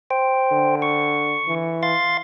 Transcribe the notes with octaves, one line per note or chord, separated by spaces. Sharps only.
C5 G5
D3
C#6
E3
F5 C6 A6